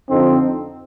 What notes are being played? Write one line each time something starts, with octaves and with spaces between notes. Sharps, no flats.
F2 D3 F3 C4 D#4